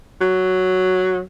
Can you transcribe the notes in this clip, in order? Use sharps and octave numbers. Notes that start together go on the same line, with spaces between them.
F#3